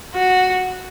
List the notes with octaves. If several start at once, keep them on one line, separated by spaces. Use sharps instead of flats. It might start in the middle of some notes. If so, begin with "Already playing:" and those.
F#4